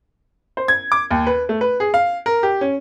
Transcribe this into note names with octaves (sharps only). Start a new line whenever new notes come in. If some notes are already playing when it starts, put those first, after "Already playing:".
C5
G#6
D6
D#2
B4
A3
B4
G#4
F5
A#4
G4
C#4